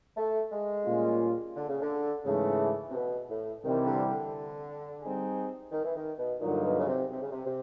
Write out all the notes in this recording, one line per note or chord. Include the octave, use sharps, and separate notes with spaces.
A3
G#3
A#2 G3 A#3 C#4 F4
D3
C#3
D3
G#2 C#3 E3 A3
C3
B2
A2
C2 C3 D#3 E3 G3 C4
D3
D3
G3 C4 D#4 G#4
D#3
E3
D#3
B2
G2 A#2 D3 F#3 A#3 D#4
B2
C#3
C3
C3
C#3
C3
C3